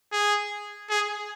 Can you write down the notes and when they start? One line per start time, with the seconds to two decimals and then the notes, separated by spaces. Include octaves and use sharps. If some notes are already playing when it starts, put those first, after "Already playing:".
0.12 G#4
0.89 G#4